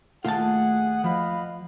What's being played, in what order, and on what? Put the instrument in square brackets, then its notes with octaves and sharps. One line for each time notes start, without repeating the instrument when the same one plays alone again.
[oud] D#2 A3 [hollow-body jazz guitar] F4 A5 [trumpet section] G#4 F#5
[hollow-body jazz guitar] F3 [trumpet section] D#5 F5 B5